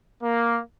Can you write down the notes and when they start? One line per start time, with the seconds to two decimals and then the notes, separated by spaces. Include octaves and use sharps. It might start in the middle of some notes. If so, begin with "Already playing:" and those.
0.23 A#3